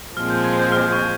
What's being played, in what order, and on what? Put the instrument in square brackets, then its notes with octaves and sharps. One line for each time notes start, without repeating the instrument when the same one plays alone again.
[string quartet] A#2 F3 G#3 C4 [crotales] F6
[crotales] G6
G#6
G6
F6
C#6